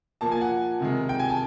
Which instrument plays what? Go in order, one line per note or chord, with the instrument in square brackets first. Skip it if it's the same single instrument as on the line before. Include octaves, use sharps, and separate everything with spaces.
[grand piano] A#2 F3 A#3 A5
G#5
F#5
C3 D#3 G#3
G5
G#5
A5